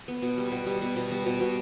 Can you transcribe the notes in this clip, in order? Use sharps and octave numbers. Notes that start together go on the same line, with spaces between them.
B3
B2
G3
B2
G3
B2
B2
G3
B2
B2